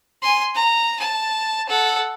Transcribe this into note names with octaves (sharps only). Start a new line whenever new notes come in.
G#5 C6
A#5
A5
A4 F#5